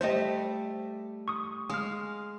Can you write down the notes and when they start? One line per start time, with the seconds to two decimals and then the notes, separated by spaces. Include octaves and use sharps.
0.01 G3 A3 C5 D#5 E5
1.28 C#6 D#6
1.70 G#3 F5 D#6 F6